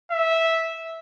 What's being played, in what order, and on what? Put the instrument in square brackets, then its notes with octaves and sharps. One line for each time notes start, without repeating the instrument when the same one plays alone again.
[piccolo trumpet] E5